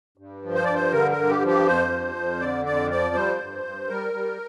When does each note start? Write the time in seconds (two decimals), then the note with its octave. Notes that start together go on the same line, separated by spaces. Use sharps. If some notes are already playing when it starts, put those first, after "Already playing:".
0.18 G2
0.42 F3
0.55 C5
0.64 G2 D5
0.75 C5
0.92 D3 A#4
1.11 A#4
1.17 G2
1.30 G4
1.42 F3
1.47 G4
1.66 F2 C5
1.91 F3
2.16 F2
2.40 D3 D5
2.66 F2 D5
2.90 F3 D5
3.15 G3 C5
3.39 G2
3.65 G2
3.89 G3 A#4
4.13 G3